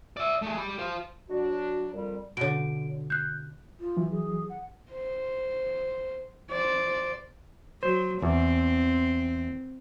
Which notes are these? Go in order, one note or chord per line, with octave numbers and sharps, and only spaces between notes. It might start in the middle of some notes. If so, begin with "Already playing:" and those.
D5 E5
A3 G#4
G4 B5
C5 F5
F#3 D4 F#4
F2 G3 A#4
B2 D3 C#5 D7
F#6 G6
F4
E3 F#3
G#4
F#5
C5
C5 D5
F#3 C5
E2 C4